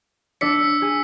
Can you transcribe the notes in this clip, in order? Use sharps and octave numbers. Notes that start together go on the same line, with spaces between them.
D4 D5 E6 B6 C#7
G#4